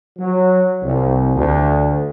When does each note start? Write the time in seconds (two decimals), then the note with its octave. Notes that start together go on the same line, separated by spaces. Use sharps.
0.18 F#3
0.83 C2
1.34 D2